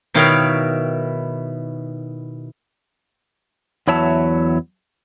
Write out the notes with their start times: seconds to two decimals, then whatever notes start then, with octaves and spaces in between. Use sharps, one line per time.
0.14 B2 D#3 E4 C#5 F5 G5
3.87 E2 F#3 E4 C#5 E5 A5